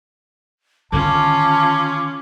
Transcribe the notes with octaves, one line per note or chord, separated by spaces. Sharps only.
D3 D#3 C#4 F4 A5 D6